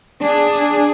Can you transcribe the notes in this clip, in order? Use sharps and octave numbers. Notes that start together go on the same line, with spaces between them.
D4 G#4